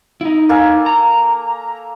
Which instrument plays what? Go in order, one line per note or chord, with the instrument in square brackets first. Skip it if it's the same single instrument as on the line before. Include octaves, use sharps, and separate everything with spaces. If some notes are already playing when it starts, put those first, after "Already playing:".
[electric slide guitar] D#4 E4
[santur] A#3 A4 G#5
[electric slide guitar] A#5